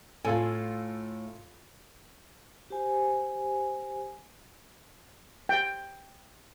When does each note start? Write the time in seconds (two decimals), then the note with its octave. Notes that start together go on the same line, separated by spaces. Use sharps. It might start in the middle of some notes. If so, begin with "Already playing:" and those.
0.25 A2 F4 A4 G#5
2.70 G4 C5 G#5
5.49 G5